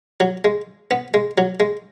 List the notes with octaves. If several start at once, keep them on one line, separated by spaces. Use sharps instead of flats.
F#3
G#3
B3
G#3
F#3
G#3